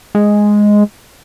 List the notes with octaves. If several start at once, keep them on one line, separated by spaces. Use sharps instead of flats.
G#3